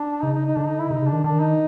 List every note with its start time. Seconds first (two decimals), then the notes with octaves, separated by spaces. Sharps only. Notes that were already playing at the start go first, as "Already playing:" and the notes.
Already playing: D4
0.23 C#3 D#4
0.34 D#4
0.45 D#4
0.57 D3 D4
0.68 D#4
0.79 E4
0.90 C3 D#4
1.02 C#3
1.07 D4
1.13 D#3
1.24 D#3 D4
1.40 D#4